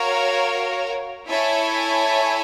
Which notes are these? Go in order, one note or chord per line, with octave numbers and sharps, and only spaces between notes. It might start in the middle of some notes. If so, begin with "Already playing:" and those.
Already playing: F#4 A#4 C#5 F5
E4 A4 C#5 E5 G#5